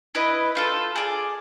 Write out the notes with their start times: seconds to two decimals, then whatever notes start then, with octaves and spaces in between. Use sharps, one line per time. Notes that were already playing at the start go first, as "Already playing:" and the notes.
0.15 E4 B4 D#5
0.55 A3 F4 A4
0.96 G#4 D5